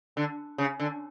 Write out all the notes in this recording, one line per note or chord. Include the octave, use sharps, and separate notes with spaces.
D3
C#3
D3